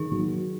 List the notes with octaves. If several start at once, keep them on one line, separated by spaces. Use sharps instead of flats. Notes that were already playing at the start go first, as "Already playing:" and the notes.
Already playing: D#3 G#4
F#3